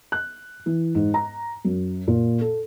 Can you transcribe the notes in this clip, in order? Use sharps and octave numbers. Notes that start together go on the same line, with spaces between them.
F#6
E3
G#2
A#5
F#2
A#2
A4